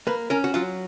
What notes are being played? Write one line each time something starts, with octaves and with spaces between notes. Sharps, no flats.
A#3 B4
C#4 A#4
F#4
F#3 F4